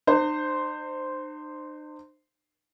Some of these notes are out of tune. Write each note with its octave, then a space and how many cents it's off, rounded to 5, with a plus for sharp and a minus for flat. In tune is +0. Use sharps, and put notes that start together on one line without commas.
D#4 -45 C5 -5